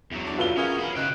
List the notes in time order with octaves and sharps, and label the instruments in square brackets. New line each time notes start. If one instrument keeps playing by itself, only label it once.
[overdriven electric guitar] E2 F#3
[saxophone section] D4
[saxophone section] B2 G3 B4 [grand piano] F4 G7 [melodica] A4
[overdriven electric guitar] C#4 [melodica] E4 G#4 [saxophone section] F#4 A#4 F5
[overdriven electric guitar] C#5 B5
[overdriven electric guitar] C#3 G5 [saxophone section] D#4 [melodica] B4 E6